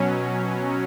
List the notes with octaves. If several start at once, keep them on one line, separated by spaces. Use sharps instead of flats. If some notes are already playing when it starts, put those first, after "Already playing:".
Already playing: B2 F#3 C#4